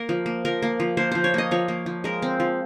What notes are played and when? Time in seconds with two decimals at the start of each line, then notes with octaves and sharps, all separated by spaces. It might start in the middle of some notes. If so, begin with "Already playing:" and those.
Already playing: A#3 A#4
0.09 F3
0.26 A#3
0.45 F3 A#4
0.62 A#3
0.80 F3
0.97 A#3 C5
1.11 F3 C5
1.24 C#5
1.34 A#3 D#5
1.51 F3 C#5
1.68 A#3
1.86 F3
2.04 G#3 A#4
2.22 C4
2.40 F3